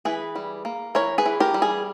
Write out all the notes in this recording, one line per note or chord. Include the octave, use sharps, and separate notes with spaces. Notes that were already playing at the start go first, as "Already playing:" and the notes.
E3 G#4 B4
G3
A#3
E3 A#4 C#5
G#4 B4
E3
G4 A#4
G3
G#4